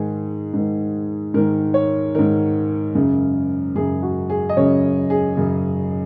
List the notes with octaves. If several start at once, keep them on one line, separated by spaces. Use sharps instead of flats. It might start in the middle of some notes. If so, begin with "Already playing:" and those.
Already playing: G#2 D#3 G#4
G#2 D#3
G#2 D#3 A#4
C#5
G#2 D#3 A#4
F#2 C#3
F#2 C#3 G#4
F#4
G#4
D#5
F#2 C#3 C#5
G#4
F#2 C#3